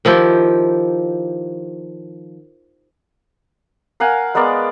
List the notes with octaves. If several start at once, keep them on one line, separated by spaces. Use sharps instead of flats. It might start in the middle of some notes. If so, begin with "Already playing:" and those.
D#3 F3 E4 G4
A#4 F5 F#5 G#5
G#3 B3 A#4 D5